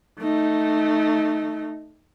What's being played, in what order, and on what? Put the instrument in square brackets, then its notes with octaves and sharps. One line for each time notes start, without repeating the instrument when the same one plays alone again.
[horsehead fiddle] A3 D#4